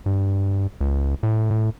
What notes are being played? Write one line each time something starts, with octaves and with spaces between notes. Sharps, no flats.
G2
C#2
A2
A2